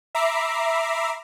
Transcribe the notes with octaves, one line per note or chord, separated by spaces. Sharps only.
E5 A#5 B5 D6 C7